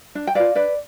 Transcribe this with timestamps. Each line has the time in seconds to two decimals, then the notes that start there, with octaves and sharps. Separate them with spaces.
0.15 D4
0.27 G5
0.35 F4 B4 D5 F5
0.55 D4 B4 D5